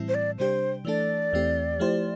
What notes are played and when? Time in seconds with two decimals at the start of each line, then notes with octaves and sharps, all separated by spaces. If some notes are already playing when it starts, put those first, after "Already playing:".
Already playing: A2 E3 G3 C4 E4
0.09 C5
0.14 D5
0.38 C3 G3 D4 G4 C5
0.85 E3 A3 D4 A4 D5
1.33 E2 E3 A3 C4 G4
1.80 F3 A3 E4 G4 C5